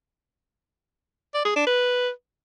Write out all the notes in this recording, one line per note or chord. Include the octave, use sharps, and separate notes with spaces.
D5
G#4
D4
B4